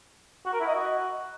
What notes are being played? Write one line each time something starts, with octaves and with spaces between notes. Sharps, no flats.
F#4
A#4
E4
D#5
F#4